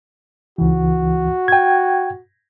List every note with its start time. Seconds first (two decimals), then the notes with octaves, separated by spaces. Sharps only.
0.58 C#2 E3 F#4
1.48 G5 G#6